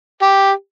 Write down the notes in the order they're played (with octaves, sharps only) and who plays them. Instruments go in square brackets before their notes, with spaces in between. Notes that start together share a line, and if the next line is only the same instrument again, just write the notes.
[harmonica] G4